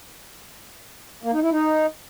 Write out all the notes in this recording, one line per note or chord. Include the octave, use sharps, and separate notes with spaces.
A#3
D#4
E4
D#4